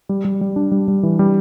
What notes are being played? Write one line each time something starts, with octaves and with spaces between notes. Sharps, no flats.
G3
G3
G3
D4
G3
G3
E3
G3